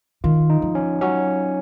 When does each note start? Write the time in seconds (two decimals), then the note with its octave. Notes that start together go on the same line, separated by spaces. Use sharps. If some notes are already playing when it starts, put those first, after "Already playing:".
0.24 D#3 F4
0.50 D#4
0.62 F3
0.75 C#4
1.01 F#3 C#4